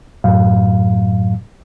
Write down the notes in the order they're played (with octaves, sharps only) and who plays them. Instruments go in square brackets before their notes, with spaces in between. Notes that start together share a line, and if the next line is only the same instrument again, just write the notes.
[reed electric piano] F#2 A2 F#3 F5